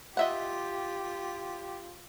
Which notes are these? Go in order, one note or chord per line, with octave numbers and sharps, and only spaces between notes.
F4 G4 D#5 E5 F#5